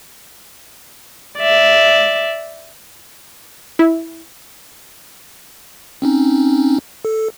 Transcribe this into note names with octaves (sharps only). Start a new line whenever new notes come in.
D5 E5
E4
C4 C#4 D#4
A4